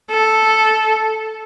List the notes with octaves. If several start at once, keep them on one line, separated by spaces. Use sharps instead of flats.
A4